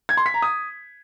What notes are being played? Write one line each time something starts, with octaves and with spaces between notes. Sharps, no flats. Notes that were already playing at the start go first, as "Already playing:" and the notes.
G#6
C6
B6
A#5
D#6